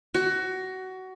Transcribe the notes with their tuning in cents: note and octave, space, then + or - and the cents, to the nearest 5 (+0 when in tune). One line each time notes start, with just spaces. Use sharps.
F#4 +20